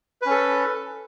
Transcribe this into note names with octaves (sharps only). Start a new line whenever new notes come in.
C#4 A4 B4